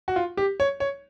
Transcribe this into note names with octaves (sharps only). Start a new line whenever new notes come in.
F#4
F4
G4
C#5
C#5